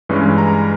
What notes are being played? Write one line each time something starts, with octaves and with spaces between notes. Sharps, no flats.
G2 E3 G#3 C#4
A#5